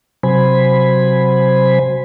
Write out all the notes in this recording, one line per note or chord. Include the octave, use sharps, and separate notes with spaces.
C3 F#3 C5 G#5 B5